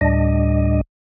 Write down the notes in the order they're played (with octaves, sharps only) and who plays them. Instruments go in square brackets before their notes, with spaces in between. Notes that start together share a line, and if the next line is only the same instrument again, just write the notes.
[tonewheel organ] D2 A2 G3 D4 D#5